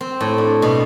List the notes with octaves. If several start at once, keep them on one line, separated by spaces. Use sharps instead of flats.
C4
A2
D4
B2